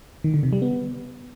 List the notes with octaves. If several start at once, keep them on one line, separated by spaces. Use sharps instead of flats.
D#3
D3
C3
G3
B3